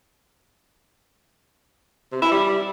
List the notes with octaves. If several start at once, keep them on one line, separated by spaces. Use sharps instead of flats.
C3
E4
G3